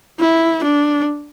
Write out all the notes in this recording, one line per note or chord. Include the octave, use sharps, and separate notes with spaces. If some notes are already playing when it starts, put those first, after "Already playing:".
E4
D4